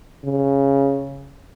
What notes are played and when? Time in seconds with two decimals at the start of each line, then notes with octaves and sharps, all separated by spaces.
0.24 C#3